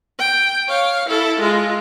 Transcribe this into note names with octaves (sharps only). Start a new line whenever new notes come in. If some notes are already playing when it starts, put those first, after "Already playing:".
G5
C#5 F5
E4 A4
G#3 F4